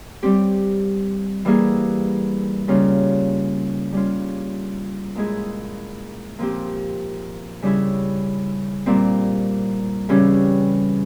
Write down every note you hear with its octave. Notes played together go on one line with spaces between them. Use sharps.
G3 C4 G4
E3 G3 A#3 E4 G#4
C#3 G3 A#3 C#4 F4
G3 C#4 F4
A#2 G#3 E4 G#4
A#2 F3 C4 G4
C#3 G3 C#4 E4
A#2 G3 C4
C#3 E3 G3 C#4 G4